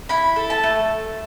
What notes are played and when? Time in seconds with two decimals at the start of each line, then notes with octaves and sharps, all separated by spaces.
0.09 E4 B5
0.36 A4
0.50 A5
0.63 A3